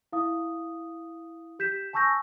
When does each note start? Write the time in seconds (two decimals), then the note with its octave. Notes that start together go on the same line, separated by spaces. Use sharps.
0.12 E4 F5 D#6
1.59 G4 G6 B6 E7
1.93 G#5 A5 C#6 E6 G6 A#6